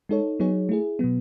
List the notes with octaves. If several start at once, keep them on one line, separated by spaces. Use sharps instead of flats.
G#3 D#4 A4 C#5
F#3 B3 D#4 G#4 C#5
A3 E4 G#4
B2 F#3 B3